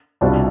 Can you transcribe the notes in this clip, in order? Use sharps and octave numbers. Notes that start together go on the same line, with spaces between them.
C2 B2 G3 D4 F4 C5